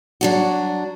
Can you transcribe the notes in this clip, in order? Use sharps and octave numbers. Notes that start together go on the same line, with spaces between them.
F#3 D4 F#4